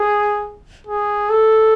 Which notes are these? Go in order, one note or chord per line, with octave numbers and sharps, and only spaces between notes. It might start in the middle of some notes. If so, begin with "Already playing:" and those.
Already playing: G#4
G#4
A4